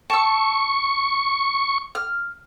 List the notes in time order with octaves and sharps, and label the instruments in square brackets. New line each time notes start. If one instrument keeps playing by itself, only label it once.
[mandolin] A5 E6 [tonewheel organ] C#6
[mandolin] F6